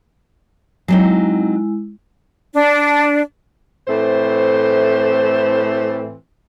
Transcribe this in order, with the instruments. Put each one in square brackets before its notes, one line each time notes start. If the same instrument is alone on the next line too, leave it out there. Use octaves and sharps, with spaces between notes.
[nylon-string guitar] F#3 C4 D#4 [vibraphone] G#3 E4
[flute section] D4
[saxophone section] A2 E3 A3 C4 C5